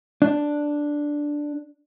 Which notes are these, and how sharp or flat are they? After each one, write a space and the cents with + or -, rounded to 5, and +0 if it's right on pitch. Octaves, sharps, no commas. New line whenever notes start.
D4 +0